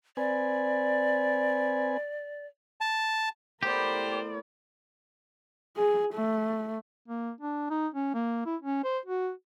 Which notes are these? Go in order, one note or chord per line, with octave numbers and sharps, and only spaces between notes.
C4 B4 D5 G#5
A5
A2 B3 G4 A#4 C5 D5
G#4
A3
A#3
D4
D#4
C#4
A#3
E4
C#4
C5
F#4